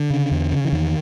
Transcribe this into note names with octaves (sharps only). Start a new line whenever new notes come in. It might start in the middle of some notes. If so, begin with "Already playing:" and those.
Already playing: D3
C#3
E2
C#3
E3
E2 D#3